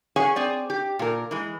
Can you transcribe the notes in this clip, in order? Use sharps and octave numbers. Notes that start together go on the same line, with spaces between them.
C#4 G#4 C#5 F#5 G#5
C4 G#4 D5
G4
A#2 A#4
E3 G#3